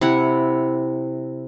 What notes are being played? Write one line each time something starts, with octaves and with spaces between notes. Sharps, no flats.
C3 E4 F#5